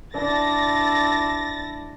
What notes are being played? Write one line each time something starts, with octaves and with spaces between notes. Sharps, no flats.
D4 E4 A6 A#6